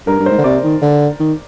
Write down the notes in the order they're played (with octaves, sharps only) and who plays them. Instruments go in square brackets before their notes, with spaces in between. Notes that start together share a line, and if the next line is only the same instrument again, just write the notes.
[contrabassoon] G2 [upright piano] A#4
[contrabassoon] G2
[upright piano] C5
[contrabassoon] G#2
D3
[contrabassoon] C3 [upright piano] D5
[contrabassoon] D#3
D3
D#3